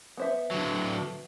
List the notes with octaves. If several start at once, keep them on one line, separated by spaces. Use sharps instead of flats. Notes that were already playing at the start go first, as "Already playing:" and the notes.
B3 C5 E5
D3 F#3